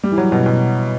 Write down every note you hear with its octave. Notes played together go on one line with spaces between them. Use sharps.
G3
E3
F#3
B2
B2